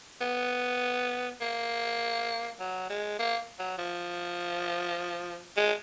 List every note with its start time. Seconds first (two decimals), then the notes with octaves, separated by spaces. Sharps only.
0.21 B3
1.41 A#3
2.59 F#3
2.90 G#3
3.19 A#3
3.59 F#3
3.78 F3
5.57 G#3